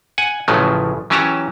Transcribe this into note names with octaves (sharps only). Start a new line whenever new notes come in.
F#5 G#5
A1 A2 C#3 F3 F#3 A3
E3 F#3 C#4 G4 A5 A#5